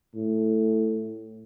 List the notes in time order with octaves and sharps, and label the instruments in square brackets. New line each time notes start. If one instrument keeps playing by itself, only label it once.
[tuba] A2